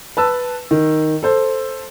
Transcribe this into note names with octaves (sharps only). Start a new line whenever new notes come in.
B4 A5 E6
D#3
A4 C5